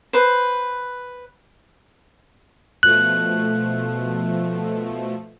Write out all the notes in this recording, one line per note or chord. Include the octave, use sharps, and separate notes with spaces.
B4 C5
B2 F3 A3 F#6